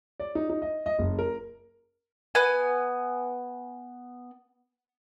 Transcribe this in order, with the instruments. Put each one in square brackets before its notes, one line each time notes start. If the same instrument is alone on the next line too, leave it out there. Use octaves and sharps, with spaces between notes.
[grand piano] D5
D#4
D#4
D#5
D#5
F#1
A#4
[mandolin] B3 G#5